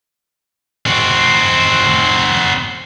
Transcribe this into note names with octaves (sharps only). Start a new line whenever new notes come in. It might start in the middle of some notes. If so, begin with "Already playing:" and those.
C4 F#4